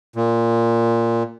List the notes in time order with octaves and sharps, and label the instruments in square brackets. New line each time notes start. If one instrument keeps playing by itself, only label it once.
[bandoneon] A#2